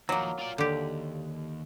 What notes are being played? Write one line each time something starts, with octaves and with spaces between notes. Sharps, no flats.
D#2 F3 F#3 A#3
F4 D5
D#2 D3 G4